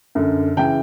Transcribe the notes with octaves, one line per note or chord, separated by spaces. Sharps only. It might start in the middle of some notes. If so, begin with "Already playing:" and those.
F#2 D3
C#3 E3 G5